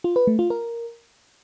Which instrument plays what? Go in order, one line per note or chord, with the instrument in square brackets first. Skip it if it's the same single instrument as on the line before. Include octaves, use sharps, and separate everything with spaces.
[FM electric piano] F4
B4
A3
F4
A#4